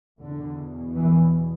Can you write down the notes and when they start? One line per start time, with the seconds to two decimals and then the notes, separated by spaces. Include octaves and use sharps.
0.20 E2 B2 D3
0.96 E3